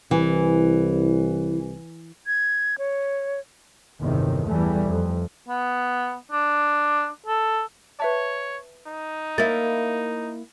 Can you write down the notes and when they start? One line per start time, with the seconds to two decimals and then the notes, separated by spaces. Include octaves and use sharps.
0.11 C2 E3
2.27 G#6
2.78 C#5
4.02 G1 E2 A2 C3 D#3
4.48 E2 E3 G3 A3
4.87 F2
5.48 B3
6.32 D4
7.26 A4
8.00 B4 C#5 E5 A5
8.87 D#4
9.38 A#3 E4 A6